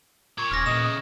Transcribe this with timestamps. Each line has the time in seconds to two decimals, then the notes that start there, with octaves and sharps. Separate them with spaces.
0.38 A#2 C#6 G#6
0.51 D#1 C#4 F6 A#6
0.66 A#2 C#3 E3 D#5 E7
0.84 D#5